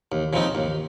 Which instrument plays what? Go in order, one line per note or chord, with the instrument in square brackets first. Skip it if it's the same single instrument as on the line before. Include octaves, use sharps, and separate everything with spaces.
[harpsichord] D#2
C#3 F3 C4 D#4
D#2